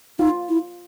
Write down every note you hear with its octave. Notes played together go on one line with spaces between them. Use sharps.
D#4 F4
E4